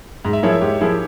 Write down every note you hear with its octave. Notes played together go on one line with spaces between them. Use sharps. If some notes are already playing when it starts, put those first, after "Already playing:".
G#2
E5
F3 A#3 E4 G#4 C#5
E5
G#2 G4
F3 A#3 E4 G#4